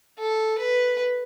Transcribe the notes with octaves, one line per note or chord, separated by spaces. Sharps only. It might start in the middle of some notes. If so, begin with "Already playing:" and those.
A4
B4